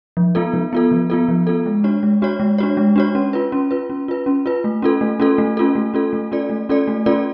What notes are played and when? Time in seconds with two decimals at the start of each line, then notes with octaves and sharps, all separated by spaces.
0.17 F3
0.35 B3 F4 A4
0.53 F3
0.73 B3 F4 A4
0.91 F3
1.10 B3 F4 A4
1.29 F3
1.47 B3 F4 A4
1.66 G#3
1.84 D4 F#4 C#5
2.03 G#3
2.22 D4 F#4 C#5
2.40 G#3
2.58 D4 F#4 C#5
2.77 G#3
2.96 D4 F#4 C#5
3.15 C#4
3.33 F4 B4
3.52 C#4
3.71 F4 B4
3.90 C#4
4.08 F4 B4
4.26 C#4
4.46 F4 B4
4.64 A3
4.82 C#4 F4 A4
5.01 A3
5.20 C#4 F4 A4
5.38 A3
5.57 C#4 F4 A4
5.76 A3
5.94 C#4 F4 A4
6.13 A3
6.32 C#4 F4 A4 D5
6.50 A3
6.69 C#4 F4 A4 D5
6.88 A3
7.06 C#4 F4 A4 D5